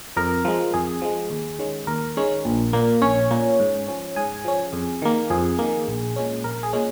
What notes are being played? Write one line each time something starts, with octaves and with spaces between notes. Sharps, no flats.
F2 A#4
F3 G#3
F2 G#4
F3 G#3
D#2
D#3 G#3 C#4
D#2 A#4
D#3 G#3 C#4
A#1
A#2 A#3
A#1 C#4 C#5
A#2 A#3
G#2
F3 C#4
G#2 G#4 G#5
F3 C#4
F2
D#3 A#3
F2 G#4
D#3 A#3
A#1
A#2 G#3 C#4
A#1 A#4
G#4
A#2 G#3 C#4